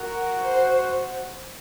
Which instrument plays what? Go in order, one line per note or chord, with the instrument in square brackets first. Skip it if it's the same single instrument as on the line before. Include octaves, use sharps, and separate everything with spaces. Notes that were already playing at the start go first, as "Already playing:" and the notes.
Already playing: [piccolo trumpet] F#4 [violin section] A#4
[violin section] C5